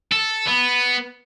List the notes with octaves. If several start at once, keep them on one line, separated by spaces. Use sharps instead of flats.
A4
B3